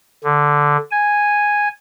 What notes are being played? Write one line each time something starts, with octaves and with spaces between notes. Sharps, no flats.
D3
G#5